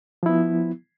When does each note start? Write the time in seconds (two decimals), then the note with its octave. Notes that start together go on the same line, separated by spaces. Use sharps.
0.23 F3
0.26 E4
0.29 B3